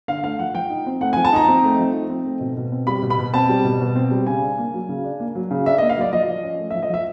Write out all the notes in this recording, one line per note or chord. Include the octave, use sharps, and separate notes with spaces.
D3 F5
A3 F5
F3 F#5
F3 G5
D#4
C4
A3 F#5
G#5
F3
A5
D#4 A#5
C4
A3
F3
D#4
C4
A3
B2
B2
C4
G3 B5
B2
B5
B2
C4 A5
G3
B2
B2
C4
G3
C#3 G#5
D4
A#3
F#3
C#3
D4
A#3
F#3
C#3
D4 E5
D#5
A#3
F5
F#3 D5
F3 D#5
F3
C#4
A3
E5
F3
D#5
F3 E5